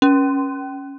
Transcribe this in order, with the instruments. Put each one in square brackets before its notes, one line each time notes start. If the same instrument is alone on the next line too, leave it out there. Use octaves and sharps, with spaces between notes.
[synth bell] C#4